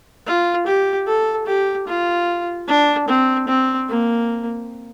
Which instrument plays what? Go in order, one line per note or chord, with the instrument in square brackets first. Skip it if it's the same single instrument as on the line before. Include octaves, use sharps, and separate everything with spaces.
[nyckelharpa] F4
G4
A4
G4
F4
D4
C4
C4
A#3